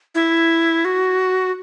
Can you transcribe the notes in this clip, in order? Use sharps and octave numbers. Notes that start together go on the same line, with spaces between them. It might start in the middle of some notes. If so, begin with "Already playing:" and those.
E4
F#4